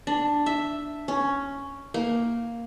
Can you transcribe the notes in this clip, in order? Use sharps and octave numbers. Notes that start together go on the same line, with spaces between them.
D4
E5
C#4
A#3